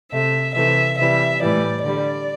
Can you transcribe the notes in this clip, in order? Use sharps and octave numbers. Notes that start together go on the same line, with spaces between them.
C3 A3 E5
C3 E3 A3 E5
C3 E3 G3 E5
A2 E3 G3 D5
D3 G3 D5